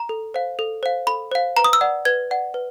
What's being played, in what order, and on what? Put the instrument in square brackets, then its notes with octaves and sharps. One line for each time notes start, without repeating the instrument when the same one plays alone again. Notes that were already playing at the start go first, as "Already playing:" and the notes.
Already playing: [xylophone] A#5
A4
C5 F5
A4
C5 F5
A4 B5
C5 F5
B4 A#5
D#6
E6
D5 F#5
B4 G#6
D5 F#5
B4